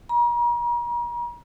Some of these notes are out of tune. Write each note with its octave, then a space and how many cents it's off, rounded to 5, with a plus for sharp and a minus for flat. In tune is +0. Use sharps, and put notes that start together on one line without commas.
A#5 +40